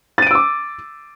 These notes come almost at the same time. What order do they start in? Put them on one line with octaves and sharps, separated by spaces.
A6 D#7 D7 E6 D6